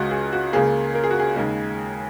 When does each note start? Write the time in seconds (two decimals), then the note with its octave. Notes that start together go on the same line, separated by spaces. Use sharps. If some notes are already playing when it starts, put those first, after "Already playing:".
Already playing: C#2 C#3 G#3 F#4 D#5
0.11 G#4
0.32 F#4
0.53 C#2 C#3 A#3 G#4
0.95 A#4
1.04 G#4
1.11 F#4
1.20 G#4
1.36 D#2 C#3 G#3